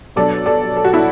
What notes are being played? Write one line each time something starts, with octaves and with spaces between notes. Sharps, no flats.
B2 F#3 D4 A4 D5
A4 D5
A4
F#4
E4 A4